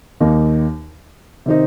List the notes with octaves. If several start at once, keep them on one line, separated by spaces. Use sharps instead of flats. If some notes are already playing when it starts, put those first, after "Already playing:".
D#2 D#3 A#3 D#4
C3 D#3 C4 D#4